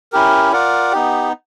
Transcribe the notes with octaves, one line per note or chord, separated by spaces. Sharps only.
C#4 E4 G4 A#4
F4 A#4 D5 F#5
B3 D#4 G4